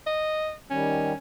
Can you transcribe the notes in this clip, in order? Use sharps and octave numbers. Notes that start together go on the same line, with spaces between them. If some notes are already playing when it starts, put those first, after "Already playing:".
D#5
D#3 G3 C#4